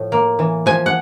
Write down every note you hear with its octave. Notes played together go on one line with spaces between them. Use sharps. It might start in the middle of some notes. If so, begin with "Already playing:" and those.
Already playing: A2 F3
A#3
E3
F3 G#5
F#5